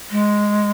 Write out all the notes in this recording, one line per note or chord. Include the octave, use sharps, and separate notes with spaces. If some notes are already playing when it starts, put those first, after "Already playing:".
G#3